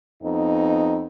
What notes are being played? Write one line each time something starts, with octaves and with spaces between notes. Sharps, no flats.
F2 B3 D#4